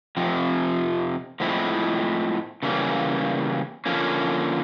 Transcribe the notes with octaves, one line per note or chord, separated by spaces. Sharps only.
F2 C3 F3
A2 F3 G#3 C4 E4
C#3 E3 G3 A#3 C#4
D3 F3 A#3 C#4